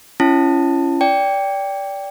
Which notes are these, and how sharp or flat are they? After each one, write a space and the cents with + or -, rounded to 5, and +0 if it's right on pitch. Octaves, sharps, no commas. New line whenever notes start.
C#4 -5 E4 +45 A5 +10
D5 -25 G5 +5